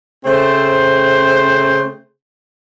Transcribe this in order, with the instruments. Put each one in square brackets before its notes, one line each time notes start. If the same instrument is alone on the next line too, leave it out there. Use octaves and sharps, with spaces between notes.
[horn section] C#3 A3 C4 C5